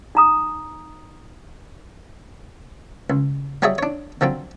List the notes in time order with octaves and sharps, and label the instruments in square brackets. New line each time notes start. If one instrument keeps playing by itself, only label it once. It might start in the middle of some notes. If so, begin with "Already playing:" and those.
[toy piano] D#4 A#5 D#6
[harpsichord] C#2
F#3 G3 G#4 C#5 D#5 E5
D4 C#5
D3 F3 F#3 C4